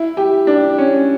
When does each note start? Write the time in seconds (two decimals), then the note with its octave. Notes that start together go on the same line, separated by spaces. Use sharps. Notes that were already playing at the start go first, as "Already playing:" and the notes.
Already playing: E4
0.17 G4
0.47 D4
0.78 C#4